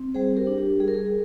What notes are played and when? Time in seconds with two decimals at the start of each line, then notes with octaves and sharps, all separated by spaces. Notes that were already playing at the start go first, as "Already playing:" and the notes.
Already playing: C4
0.14 G3 G#4 C5
0.37 G4 A#4
0.47 D4
0.58 G4
0.80 G3 G#4
0.88 A#4
0.94 G#4